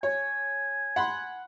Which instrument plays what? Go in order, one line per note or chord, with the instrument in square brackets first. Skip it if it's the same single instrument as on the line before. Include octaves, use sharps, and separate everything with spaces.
[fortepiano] C#5 [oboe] G#5
[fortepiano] F#5 B5 C6